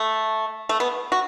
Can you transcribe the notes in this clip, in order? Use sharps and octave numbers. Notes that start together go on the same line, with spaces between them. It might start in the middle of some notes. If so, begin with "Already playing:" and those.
Already playing: A3
A3
B3
F#4